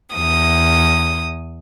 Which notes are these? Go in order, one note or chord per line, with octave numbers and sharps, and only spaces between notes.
E2 D#6